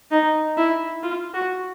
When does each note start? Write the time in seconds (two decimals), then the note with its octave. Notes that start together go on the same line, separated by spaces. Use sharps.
0.11 D#4
0.57 E4
1.03 F4
1.34 F#4